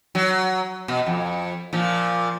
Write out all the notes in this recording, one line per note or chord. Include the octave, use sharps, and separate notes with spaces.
F#3
B2
F2
A#2 F3